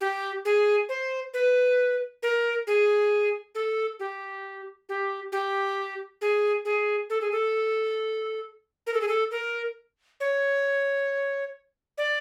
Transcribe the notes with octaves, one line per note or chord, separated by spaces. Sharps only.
G4
G#4
C5
B4
A#4
G#4
A4
G4
G4
G4
G#4
G#4
A4
G#4
A4
A#4
A4
G#4
A4
A#4
C#5
D5